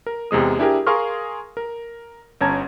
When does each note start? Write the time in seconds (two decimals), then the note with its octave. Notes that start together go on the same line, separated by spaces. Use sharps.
0.06 A#4
0.31 E2 C3 G#3 D#6
0.59 D4 E4 G4 G#4 A#4
0.87 G#4 A#4 F5 C6 C#6 F6
1.57 A#4
2.41 G1 C#4 A5 A#5 G#6